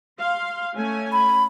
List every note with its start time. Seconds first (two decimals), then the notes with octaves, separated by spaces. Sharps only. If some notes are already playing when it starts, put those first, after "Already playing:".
0.19 F5 C6
0.76 A3 C#4 G#5
1.13 B5